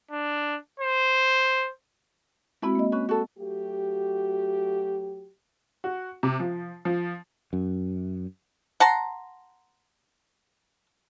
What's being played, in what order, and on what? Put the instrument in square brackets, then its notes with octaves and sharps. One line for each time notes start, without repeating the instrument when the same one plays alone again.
[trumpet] D4
C5
[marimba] G#3 C4 F#4 [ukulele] E4 B5
[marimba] A#3 D#5
[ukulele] C#4 B4
F#4 A4
[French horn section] F#3 A3 F#4 G4
[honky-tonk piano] F#4
C3
F3
F3
[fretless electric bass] F#2
[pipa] F#5 A5 A#5 C6